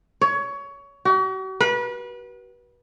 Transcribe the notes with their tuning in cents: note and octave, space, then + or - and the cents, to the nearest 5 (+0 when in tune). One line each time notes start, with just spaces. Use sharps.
C#5 +20
F#4 +45
B4 -30